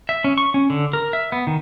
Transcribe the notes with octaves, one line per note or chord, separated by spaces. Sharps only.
E5
C#4
C#6
C#4
D3
A#4
E5
B3
D#3